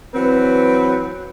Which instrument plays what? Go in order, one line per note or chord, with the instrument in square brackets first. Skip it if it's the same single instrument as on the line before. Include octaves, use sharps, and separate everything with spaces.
[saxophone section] E3 F#3 C4 [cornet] B4